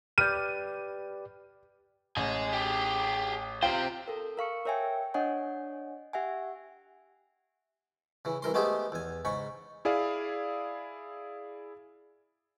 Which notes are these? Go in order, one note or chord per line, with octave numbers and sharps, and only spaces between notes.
G4 B4 D5 F6 G6 D#7
A1 D#5 G#5
G4 G#4
C3 F4 C5 G5
A4 A#4
A#4 F5 C#6 C#7
A#4 C#5 E5 G5 G#5
D4 C#5 D#5 F#5 G#5
G4 E5 F#5 G#5
C#3 E3
C2 E3 A#4 C6
G#3 A3 B3 G4 G#4 C5
E2 G#5
G#2 C#3 B5 C#6
E4 G#4 D5 F5